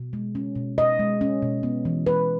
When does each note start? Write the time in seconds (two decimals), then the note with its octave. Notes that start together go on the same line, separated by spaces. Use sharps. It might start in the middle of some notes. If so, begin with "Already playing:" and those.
Already playing: B2
0.13 G#3
0.35 C#4
0.56 B2
0.78 B2 D#5
0.99 G#3
1.21 C#4
1.42 B2
1.63 B3
1.85 E3
2.06 G#3 B4